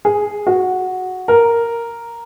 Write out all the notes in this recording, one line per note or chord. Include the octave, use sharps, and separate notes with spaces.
G#4
F#4
A#4